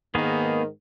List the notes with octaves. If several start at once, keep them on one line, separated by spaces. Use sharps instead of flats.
G#2 D#3 A#3 B3 G#4